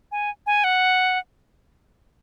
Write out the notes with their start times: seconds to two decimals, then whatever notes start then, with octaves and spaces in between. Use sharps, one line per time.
0.12 G#5
0.47 G#5
0.64 F#5